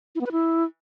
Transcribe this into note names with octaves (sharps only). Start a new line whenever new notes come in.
E4
B3
B4
E4